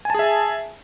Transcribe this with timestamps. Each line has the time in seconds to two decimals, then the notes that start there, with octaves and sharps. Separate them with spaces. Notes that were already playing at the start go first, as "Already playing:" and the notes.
0.05 G#5
0.10 A5
0.15 G#4
0.19 E5